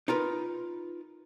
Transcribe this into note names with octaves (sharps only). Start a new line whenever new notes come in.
D#4 F4 A#4 B4